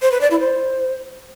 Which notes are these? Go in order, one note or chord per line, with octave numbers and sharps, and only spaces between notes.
C5
B4
D5
E4
C5